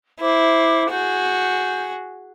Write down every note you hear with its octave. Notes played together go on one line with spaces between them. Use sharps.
E4 C5 D6
F#4 G#4 G6